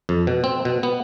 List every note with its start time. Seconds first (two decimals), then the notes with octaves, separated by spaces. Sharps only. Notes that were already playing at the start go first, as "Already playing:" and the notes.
0.09 F2
0.27 B2
0.44 C4
0.65 B2
0.83 B3